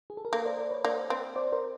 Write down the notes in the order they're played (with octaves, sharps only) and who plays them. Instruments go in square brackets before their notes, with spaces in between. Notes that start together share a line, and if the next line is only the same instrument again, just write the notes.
[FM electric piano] G#4
A4
A#4
[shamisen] A#3 [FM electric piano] A4 B4
[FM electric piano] C5 D5
C5 D5
B4 C#5
[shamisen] A#3 [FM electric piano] C5 D5
[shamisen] C4
[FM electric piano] C5 D5
A#4 C5